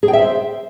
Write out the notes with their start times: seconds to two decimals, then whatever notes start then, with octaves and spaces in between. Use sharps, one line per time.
0.03 G#4
0.08 G5
0.13 E5
0.19 C5